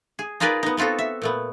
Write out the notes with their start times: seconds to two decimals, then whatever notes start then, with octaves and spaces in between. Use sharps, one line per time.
0.19 G#4
0.40 D#4 F4 G#4 A#4 B4 D5
0.63 B3 D#4
0.77 B3 C4 F4 F#4 A4
0.99 E5
1.22 A#2 A3 B3